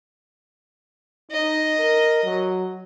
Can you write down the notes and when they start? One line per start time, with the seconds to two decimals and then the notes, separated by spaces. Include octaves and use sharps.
1.31 D#4 D#5
1.78 A#4
2.24 F#3